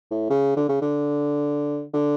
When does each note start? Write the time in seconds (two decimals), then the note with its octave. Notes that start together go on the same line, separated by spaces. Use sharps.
0.11 A2
0.30 C#3
0.57 D3
0.69 C#3
0.82 D3
1.94 D3